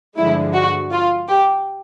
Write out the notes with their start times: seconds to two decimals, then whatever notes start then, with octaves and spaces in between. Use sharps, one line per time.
0.17 G2 D3 F3 G#3 E4
0.54 F#4
0.91 F4
1.28 G4